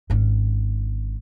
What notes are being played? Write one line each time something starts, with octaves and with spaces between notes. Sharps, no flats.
G#1 C#4